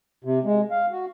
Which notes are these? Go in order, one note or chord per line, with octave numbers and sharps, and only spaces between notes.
C3
G#3
F5
F#4